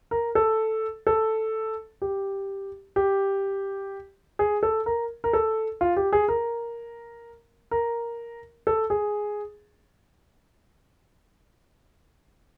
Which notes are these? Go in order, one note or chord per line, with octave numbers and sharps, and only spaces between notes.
A#4
A4
A4
G4
G4
G#4
A4
A#4
A#4
A4
F4
G4
G#4
A#4
A#4
A4
G#4